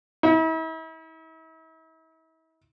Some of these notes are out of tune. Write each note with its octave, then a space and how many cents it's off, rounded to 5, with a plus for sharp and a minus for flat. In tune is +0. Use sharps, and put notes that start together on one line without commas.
E4 -40